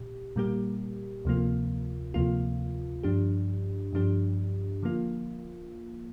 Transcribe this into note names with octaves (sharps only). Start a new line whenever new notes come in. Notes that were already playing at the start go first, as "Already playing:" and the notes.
Already playing: A#2 G4
A#2 G3 A#3 G4
D2 C3 F3 A#3 F4
D2 C3 F3 A#3 F4
G2 F3 D4 G4
G2 F3 D4 G4
D3 F3 A#3 F4